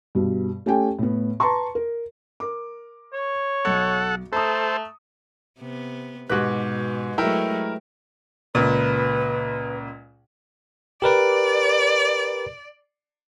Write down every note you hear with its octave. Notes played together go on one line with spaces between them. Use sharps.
G2 B2
A3 C#4 G4 A4 G5 G#5
A2 B3
B4 A5 A#5 C6 C#6
A#4
A#4 D6
C#5
B1 A4 F#5 C#7
A3 A4 C5 A#5 D#6
C3 B3
G#2 B2 F#4 G4 B4 F#6
F#3 G#3 A3 E4 A#4 G5
C#2 A#2 B4
G4 A#4 B4 D5